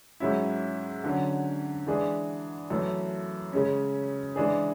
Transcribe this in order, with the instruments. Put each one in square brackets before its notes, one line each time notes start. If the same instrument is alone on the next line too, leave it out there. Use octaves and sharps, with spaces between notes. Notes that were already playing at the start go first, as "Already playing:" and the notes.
[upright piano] G#2 F#3 C#4 E4
D3 F#3 C#4
E3 G#3 D4 G#4
F#2 E3 A3
C#3 G#3 C#4
E3 G#3 D4 G#4